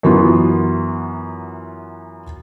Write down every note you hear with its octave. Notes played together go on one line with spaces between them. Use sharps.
F#2 E3 F#3 B3 F4